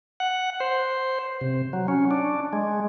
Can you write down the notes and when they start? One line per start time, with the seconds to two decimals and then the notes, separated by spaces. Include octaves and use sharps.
0.20 F#5
0.60 C5
1.41 C3
1.73 F#3
1.88 C#4
2.11 D4
2.53 G#3